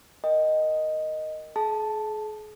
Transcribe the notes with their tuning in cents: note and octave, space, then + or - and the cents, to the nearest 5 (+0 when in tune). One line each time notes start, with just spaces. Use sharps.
A#4 +0 D#5 +0 G5 +5
G#4 +40 A5 +0